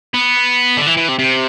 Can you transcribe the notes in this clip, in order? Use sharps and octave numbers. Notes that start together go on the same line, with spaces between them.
B3
D3
E3
E3
C3
C3